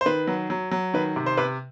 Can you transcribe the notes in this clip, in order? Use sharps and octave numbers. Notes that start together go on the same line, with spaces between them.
C5
D#3 B4
F#3
F#3
F#3
D#3 B4
C3
C5
C3 B4